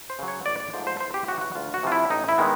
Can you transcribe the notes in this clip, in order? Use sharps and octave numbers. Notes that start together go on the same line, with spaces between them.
C5
C#3 F#3
C#5
A1 D5
D5
G#2 F3 A3 C5
C5
E2 C5
G4
C#3 E3 F#4
F#4
D2 F4
F#4
C3 F3 F4
E4
A1 D#4
E4
D#3 G#3 B3